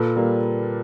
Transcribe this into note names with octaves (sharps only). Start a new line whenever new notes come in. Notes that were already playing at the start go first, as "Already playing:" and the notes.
Already playing: A#2 A4 B4
G3 A#3